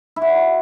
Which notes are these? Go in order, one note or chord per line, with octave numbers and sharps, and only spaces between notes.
E4
F#4